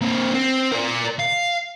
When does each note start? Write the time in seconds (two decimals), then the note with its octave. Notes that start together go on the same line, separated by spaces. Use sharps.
0.02 A#3 C4
0.34 C4
0.72 A#4 D5
1.19 F5